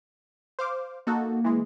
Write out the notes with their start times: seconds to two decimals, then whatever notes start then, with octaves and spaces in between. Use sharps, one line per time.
0.59 C5 F5 D6
1.07 A#3 D#4 F#4 A4
1.44 E3 G#3